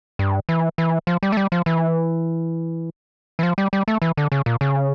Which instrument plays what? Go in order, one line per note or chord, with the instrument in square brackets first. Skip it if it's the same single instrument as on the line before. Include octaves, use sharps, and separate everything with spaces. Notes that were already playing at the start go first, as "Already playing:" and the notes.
[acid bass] G2
E3
E3
F3
G3
A3
G3
F3
E3
E3
F3
G3
G3
A3
E3
D3
C#3
A#2
C#3